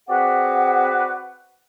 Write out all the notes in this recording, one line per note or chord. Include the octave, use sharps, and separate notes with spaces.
C4 F#4 G#4 B4 D5 F#5